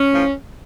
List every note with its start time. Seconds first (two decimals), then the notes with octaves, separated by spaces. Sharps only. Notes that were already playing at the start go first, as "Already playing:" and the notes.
Already playing: C#4
0.11 A2 F3